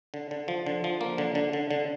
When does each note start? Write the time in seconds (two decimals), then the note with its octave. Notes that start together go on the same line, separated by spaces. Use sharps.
0.14 D3
0.31 D3
0.48 F3
0.66 D3
0.84 F3
1.01 A#3
1.18 D3
1.35 D3
1.53 D3
1.70 D3